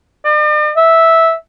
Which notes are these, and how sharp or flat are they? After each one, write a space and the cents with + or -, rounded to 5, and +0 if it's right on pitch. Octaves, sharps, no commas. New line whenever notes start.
D5 +45
E5 -10